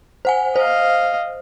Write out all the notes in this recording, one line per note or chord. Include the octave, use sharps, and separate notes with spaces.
C5 F#5 G#5
C5 D#5 F5